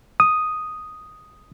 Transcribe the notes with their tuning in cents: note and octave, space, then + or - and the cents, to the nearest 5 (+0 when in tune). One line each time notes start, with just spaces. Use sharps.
D#6 +0